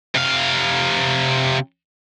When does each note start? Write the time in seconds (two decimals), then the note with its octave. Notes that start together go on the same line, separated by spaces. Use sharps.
0.15 C3 F5